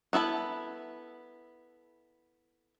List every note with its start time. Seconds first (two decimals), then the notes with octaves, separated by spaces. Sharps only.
0.13 B3 E4 A4 B5